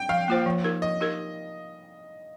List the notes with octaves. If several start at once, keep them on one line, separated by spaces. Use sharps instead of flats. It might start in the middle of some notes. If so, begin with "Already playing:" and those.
Already playing: G5
F3 F5
A#3 F4 C5
F3
D#4 G4 A#4
F3 D#5
D#4 G4 A#4